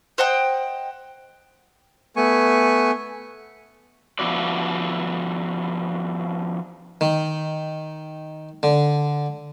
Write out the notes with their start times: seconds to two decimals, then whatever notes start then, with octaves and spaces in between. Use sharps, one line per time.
0.18 C5 D#5 F#5 G5
2.17 A3 B3 G#5 C#6
4.19 F3 B3 E4 F#4 D5
7.01 D#3
8.63 D3